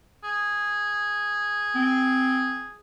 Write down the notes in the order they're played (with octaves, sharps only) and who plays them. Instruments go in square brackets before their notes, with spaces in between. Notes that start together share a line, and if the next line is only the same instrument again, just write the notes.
[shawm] G#4
[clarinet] C4